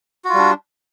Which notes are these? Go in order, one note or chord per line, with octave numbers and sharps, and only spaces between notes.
G3 D4 F4 F#4